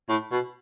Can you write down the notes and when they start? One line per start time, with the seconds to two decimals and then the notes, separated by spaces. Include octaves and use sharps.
0.09 A2
0.32 B2